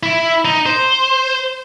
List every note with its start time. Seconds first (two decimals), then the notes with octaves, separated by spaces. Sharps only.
0.03 E4
0.45 D#4
0.66 C5